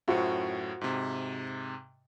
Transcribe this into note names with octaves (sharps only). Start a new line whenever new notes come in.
F#2 A2 F4 F#4 C5
G#2 C3